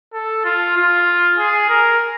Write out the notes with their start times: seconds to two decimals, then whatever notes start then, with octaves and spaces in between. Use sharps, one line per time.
0.13 A4
0.45 F4
0.76 F4
1.37 G#4
1.69 A#4